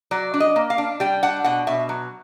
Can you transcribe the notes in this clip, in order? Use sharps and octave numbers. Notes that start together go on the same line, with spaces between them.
F#3 D5
D4
D#5
A#3
F5
D4
G3 G5
D4 F#5
B2 F#5
B2 E5
F#3